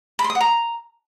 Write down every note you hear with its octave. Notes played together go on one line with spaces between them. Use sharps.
B5
C6
D#6
F#5
A#5